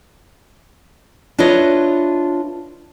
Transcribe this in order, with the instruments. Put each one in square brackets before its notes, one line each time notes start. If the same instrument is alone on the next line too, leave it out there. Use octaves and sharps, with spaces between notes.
[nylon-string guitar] D4 E4 F4 B4 C#5 D#5